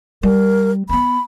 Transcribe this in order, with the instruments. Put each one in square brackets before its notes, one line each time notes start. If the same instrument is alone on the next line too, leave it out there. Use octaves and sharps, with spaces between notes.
[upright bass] G3 [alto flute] A#4
[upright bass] B3 C4 [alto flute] B5